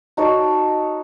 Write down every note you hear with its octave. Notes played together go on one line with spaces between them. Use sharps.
D#4 F#4 A4 C#5